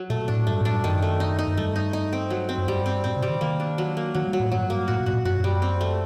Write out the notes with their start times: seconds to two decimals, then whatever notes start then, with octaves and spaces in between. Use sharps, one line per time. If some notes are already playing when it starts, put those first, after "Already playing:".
Already playing: F#3
0.10 A#2 A3
0.28 A2 D4
0.47 G2 A3
0.61 A2 D4
0.72 G2
0.84 F#2 D#3
1.02 A3
1.20 D#4
1.39 D#4
1.47 F#2
1.57 G2 A3
1.76 D#4
1.93 D#4
2.13 C4
2.30 F#3
2.49 C4
2.57 F#2
2.68 G2 G3
2.86 C4
3.04 A2 C4
3.16 C3
3.22 G3
3.29 D#3
3.41 D#3 A#3
3.60 D4
3.78 F#3
3.97 A#3
4.14 D#3 F#3
4.27 G3
4.33 F#3
4.39 A2
4.52 G2 F#3
4.70 A#3
4.88 A2 F#4
5.00 A#2
5.06 A2 F#4
5.13 A#2
5.25 F#2 F#4
5.40 F#2 G3
5.62 C4
5.81 A3